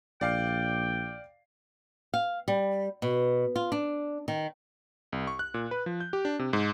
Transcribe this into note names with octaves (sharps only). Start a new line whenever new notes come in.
A#1 D5 F5 G5 C7
F5
G3
B2
F4
D4
D#3
C2
C#6
F#6
A#2
B4
F3
G6
G4
D4
C3
G#2